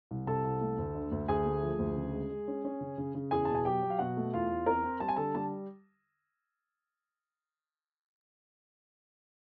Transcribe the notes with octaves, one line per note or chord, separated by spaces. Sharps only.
C2
C3 A4 A5
C2
A3
D2
D3
D2
D2 G#4 G#5
A3
F3
D2
C#3
G#3
G#3
C#4
C#4
C#3
C#3
C#3
E2 G#4 G#5
B2 A5
G#5
F#3 G4 G5
F#3
F5
B2 F#4 F#5
A3
E2 F4 F5
E2
C4 A#4 A#5
C4
G3 A5
G#5
D3 A4 A5
G3 A5